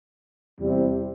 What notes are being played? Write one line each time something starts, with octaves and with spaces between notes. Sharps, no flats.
E2 C3 G3 C4 E4